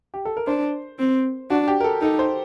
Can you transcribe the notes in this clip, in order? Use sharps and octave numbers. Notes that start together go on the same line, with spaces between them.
G4
A4
A#4
D4 C5
C4
D4 F#4
G4
A#4
A4
D#4 A4
C5